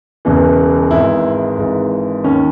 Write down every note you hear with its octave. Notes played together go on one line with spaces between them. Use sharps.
E1 E2 C#3 E3
G#1 G#2 E3 E4
G#1 G#2 E3
D#2 D#3 C#4